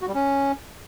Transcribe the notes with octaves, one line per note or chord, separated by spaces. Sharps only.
F#4
G3
C#4